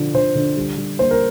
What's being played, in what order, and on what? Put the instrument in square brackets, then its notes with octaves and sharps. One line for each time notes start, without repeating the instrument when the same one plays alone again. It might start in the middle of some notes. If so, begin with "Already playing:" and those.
Already playing: [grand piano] D3 F3
D3 C5
D3
G3
G3
A#3 C5
A#4